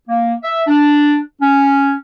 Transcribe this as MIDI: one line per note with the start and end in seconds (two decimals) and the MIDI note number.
0.07 0.33 58
0.42 0.62 76
0.67 1.19 62
1.41 1.92 61